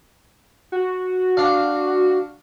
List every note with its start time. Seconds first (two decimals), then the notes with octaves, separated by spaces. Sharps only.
0.72 F#4
1.37 D4 F5